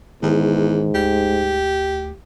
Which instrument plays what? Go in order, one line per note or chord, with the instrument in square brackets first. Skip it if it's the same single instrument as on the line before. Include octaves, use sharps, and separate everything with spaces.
[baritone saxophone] E2 [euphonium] G#2 [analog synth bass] D#3
[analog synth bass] D2 [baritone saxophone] G4